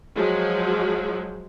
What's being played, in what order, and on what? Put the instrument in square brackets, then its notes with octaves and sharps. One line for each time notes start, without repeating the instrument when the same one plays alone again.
[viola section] F3 F#3 G#3